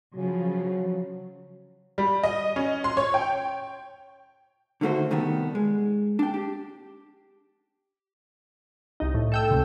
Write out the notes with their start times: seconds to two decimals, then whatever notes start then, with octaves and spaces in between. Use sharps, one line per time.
0.15 C#3 F3 F#3
1.98 G3
2.23 D#5
2.56 C#4
2.84 C6
2.97 C#5
3.14 G5
4.81 D3 D#3 A3 F#4 C5
5.11 C2 D#3 G3 A3 B3
5.55 G#3
6.19 D4 G5
6.34 G4
9.00 C2 D#4
9.14 A2
9.32 A4 G5 E6
9.51 C#2 C3